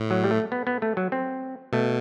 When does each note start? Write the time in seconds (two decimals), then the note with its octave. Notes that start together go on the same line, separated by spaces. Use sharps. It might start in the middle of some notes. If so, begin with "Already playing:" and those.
Already playing: A2
0.11 F#3
0.24 G3
0.31 A3
0.52 B3
0.67 B3
0.82 A3
0.97 F#3
1.12 C4
1.73 B2 A3